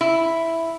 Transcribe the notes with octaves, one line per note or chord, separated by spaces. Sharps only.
E4